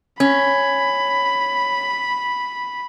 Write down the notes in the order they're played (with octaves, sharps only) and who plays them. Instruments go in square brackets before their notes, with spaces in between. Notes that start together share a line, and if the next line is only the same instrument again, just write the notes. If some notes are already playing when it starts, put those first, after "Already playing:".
[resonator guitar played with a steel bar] C#4 [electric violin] B5